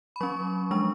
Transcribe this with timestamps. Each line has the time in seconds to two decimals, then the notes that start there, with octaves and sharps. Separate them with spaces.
0.16 B5
0.21 F#3 C#4 C#6
0.71 F3 G#3 D4 C#6